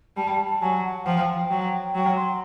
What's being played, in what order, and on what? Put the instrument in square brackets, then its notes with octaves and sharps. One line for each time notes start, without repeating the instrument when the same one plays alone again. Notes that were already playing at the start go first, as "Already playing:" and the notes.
[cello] G3 [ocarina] A5
[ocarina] A5
A5
[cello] F#3 [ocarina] G#5
[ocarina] F#5
[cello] F3 [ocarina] G5
[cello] F#3
[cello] F#3 [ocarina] G5
[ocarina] C6